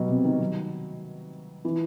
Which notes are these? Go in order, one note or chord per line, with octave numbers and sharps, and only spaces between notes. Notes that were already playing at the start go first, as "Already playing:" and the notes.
Already playing: B2 F#3 G3
C3
D#3
F#3
E3